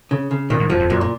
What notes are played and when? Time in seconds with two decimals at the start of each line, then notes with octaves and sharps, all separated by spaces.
0.11 C#3
0.31 C#3
0.50 A#2 D#3
0.60 G#2
0.69 F#2 F3
0.80 F2
0.90 F#2 A#2
1.01 A#2